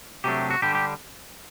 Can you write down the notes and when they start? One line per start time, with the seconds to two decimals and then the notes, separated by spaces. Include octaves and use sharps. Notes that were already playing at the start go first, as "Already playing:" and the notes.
0.24 C3 F#3 A3 D4 G4
0.50 F#4
0.62 D3 G3 D4 G4
0.75 G4